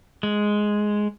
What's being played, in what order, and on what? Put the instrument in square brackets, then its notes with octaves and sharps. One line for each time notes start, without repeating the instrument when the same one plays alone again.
[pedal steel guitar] G#3